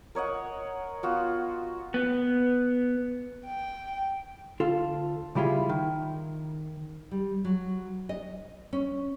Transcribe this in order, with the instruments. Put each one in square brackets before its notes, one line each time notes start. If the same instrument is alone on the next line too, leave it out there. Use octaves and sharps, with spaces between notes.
[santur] A#4 C#5 D#5 F#5
B3 F4 F#4
[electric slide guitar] B3
[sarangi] G5
[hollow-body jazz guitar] D2 F4 A4
C#3 G3 E4 F4 G#4
D#3
[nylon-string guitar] G3
F#3
D#5
C#4